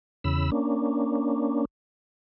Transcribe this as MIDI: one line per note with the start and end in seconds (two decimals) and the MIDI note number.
0.24 0.50 40
0.24 0.50 49
0.24 0.50 83
0.24 0.50 88
0.52 1.65 58
0.52 1.65 61
0.52 1.65 62